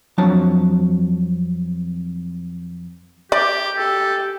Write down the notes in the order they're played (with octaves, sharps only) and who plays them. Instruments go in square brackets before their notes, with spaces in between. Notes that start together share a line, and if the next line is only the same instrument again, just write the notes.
[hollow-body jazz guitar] F2 F#3 D4 F#4 A5
[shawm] G4 [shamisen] D5
[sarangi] G4 [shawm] A4